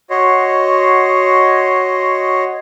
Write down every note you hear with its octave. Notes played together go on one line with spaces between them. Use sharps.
F#4 C#5 D#5 C6